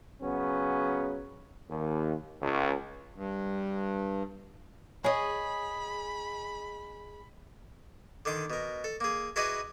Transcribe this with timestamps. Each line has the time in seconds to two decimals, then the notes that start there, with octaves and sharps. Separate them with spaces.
0.22 C#3 F#3 B3 C#4
1.70 D#2
2.42 C#2
3.14 G2
5.04 G#4 C#5 D#5 B5
8.25 D3 D#3 C6 D6
8.50 B2 A#4
8.84 A4
9.00 A#3 G#4
9.36 E4 F#4 G#4 B4 D5 D#5